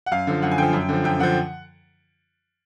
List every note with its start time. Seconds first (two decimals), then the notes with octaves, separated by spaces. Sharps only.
0.06 F#5
0.12 F#2 F5
0.27 D3 F3
0.42 F#2 F#5
0.51 G#5
0.58 D3 F3 G5
0.73 F#2
0.89 D3 F3
1.04 F#2 G5
1.19 D3 F3 F#5